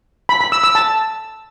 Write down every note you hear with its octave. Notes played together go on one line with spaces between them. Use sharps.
B5
B5
E6
E6
A5